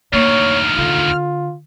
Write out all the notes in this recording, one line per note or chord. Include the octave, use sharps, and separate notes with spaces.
D2 D#3 A#3 C#5 F6
D3 F4